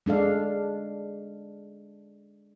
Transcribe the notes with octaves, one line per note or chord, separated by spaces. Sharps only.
G#3 D4 A4 F5